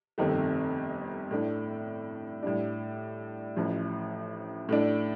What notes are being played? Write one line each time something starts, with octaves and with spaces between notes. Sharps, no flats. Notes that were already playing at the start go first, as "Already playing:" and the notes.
G1 F2 C3 D#3 A3
A2 A3 D4
A2 G3 D4
A1 A2 F3
A2 A3 D4